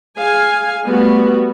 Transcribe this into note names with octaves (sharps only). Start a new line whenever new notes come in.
G#4 F5 G#5
G3 A3 B3 F#4